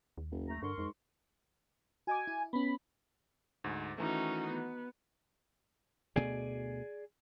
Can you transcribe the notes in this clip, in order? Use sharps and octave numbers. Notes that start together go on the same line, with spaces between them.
D#2
F#1
A3 A#5
G2 D3 A#4 C6 C#6
F2 G#2
F#4 D#5 G#5 D6
E4
B3 C#4 B5
D2 G#2
D#3 E3 A3 C#4 D#4 F#4
B3
D2 B2 A3 G#4 D5 G#5